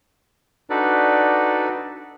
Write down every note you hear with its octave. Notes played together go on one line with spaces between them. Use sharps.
D4 D#4 F#4 A4 B4 D5